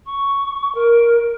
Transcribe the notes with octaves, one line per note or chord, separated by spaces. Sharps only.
C#6
A#4